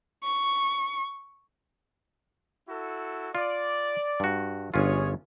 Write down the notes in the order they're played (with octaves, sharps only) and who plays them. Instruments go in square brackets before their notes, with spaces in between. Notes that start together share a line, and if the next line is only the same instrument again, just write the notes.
[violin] C#6
[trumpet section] E4 F#4 A4
[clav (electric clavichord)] F4 [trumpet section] D5
[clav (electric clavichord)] G2 F#4
[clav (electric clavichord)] G1 C#4 F4 [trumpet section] G#4 C#5